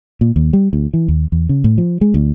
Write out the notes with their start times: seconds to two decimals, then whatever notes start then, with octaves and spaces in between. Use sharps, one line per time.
0.21 A#2
0.36 D#2
0.53 G3
0.73 D2
0.94 E3
1.08 D#2
1.32 E2
1.49 C#3
1.64 A2
1.78 F3
2.01 G#3
2.14 D2